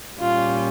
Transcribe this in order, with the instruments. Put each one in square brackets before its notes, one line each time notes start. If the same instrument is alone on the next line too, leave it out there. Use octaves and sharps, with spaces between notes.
[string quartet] A#2 G3 C#4 F4